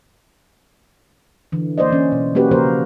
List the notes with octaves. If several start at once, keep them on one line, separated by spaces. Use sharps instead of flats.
D3 E3
A#3 C5 D5 D#5
E3 C#4
B2
A#3 C#4 F#4 G4 B4
C#3 F3 A#3 G4 A#4 C5